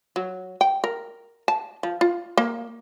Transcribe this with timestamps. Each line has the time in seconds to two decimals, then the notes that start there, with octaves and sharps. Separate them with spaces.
0.16 F#3
0.61 G5
0.84 A#4
1.48 A5
1.83 F3
2.01 F4
2.37 A#3